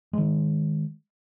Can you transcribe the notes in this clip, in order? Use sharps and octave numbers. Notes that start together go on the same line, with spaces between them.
D#3 G#3